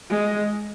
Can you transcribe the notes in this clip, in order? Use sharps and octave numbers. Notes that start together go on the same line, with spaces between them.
G#3